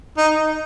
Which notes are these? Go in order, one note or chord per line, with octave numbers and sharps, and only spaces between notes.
D#4